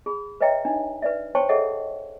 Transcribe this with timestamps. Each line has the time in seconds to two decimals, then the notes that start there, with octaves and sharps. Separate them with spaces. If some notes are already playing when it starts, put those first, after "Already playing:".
0.06 G#4 B5
0.41 B4 C#5 D#5 E5 G5 A#5
0.65 D4 D#4
1.02 B4 D5 E5
1.35 C5 C#5 G5 A5 C6 C#6
1.49 G#4 A4 C#5 D#5 E5 F#5